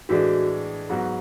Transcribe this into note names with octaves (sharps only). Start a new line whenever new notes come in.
A2 E3 G#3 D4 F#4
G#2 F#3 B3 F#4